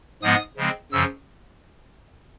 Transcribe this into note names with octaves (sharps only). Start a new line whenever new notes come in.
G#2 F3 G#3 B3 D#6
C#3 F3 G#3 C4
F#2 C#3 F3 E6